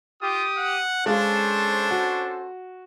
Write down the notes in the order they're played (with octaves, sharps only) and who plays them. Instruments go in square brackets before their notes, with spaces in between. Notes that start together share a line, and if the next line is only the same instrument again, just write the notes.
[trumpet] F4 [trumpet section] G4 D#6
[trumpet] F#5
[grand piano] G#3 F5 [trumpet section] C#4 A4 C5 [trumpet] D4
[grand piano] F#4